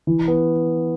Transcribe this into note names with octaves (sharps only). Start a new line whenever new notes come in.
E3
B3